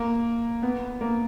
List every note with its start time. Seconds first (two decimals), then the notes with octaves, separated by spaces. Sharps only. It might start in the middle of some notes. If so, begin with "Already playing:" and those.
Already playing: A#3
0.63 B3
1.01 A#3